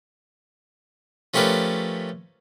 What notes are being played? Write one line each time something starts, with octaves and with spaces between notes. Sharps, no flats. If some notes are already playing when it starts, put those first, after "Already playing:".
F3 A3 C#4 G4 A#4 B4